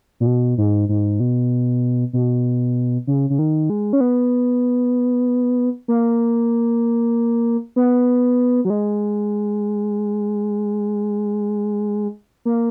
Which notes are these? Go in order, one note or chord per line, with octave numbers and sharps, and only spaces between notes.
A#2
B2
G#2
G#2
B2
B2
C#3
C#3
D#3
G#3
C#4
B3
A#3
B3
F#3
G#3
A#3